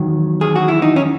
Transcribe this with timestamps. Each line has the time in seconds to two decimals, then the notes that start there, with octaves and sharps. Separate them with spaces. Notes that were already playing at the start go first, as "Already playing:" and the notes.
Already playing: E2 D#3 F#3
0.41 G#4
0.56 F#4
0.68 E4
0.82 D#4
0.96 C#4